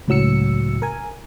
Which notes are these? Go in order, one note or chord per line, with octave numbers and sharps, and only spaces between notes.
C#2 A2 F#3 E6 C#7
A#4 G#5